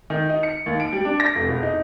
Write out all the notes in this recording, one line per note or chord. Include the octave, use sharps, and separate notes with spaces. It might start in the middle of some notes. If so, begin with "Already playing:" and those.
D#3
D#4
C#7
D#2
D7
G3
D4
A#6
F1
E1
D#4